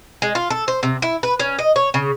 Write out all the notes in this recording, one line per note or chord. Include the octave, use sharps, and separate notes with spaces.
G#3
F4
A4
C5
C3
E4
B4
C#4
D#5
C#5
C#3